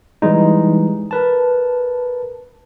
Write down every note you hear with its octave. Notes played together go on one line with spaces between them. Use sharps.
E3 G3 G#3 D#4
A#4 B4 A5